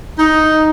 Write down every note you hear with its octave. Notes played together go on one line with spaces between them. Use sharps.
D#4